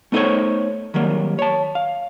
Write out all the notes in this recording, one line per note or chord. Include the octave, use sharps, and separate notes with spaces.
A3 B3 D#4 A4 C5 C#5
D#3 F#3 G3 A#3
C#5 A5
F5